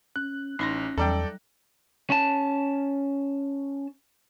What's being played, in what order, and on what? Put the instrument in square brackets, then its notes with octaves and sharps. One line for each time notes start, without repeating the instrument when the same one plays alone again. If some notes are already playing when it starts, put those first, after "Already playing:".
[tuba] C#4 [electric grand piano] F#6
[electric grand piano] A1 A#6 [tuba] C#4 [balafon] D#4 B5 C6
[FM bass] E2 [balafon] F#3 G3 A#5 [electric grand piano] A4 D5 G5
[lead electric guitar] C#4 A5